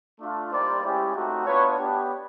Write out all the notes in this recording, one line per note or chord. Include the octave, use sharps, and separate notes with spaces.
A3 D4 F4
G3 A#3 D#4 G4 C5 D5
G#3 C#4 E4 G4
A3 C4 D#4 F#4
B3 D4 F4 B4 C#5
B3 D4 G4